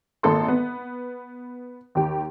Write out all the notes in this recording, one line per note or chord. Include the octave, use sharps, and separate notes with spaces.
G#1 A#2 A4 C6
B3
D#2 G4